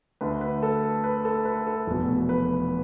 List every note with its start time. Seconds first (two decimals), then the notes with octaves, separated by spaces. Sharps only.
0.21 D2 D3 B4
0.41 B4
0.63 A4
1.04 B4
1.25 A4
1.45 B4
1.67 A4
1.87 F1 E2 B2
2.29 B4